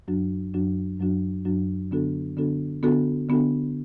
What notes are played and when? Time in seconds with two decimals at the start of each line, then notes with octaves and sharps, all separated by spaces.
0.08 F#2 F#3 D4 F#4
0.54 F#2 F#3 D4 F#4
0.99 F#2 F#3 D4 F#4
1.45 F#2 F#3 D4 F#4
1.91 D3 B3 D4 F#4 A4
2.37 D3 B3 D4 F#4 A4
2.83 D3 B3 D4 F#4 A4
3.29 D3 B3 D4 F#4 A4